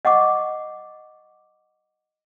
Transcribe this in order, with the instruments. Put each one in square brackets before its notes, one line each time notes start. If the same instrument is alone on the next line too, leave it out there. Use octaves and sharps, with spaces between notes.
[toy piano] D#5 F#5 C#6 D6